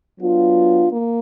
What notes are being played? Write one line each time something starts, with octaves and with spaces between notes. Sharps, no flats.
F#3 B3 D4 F4
A#3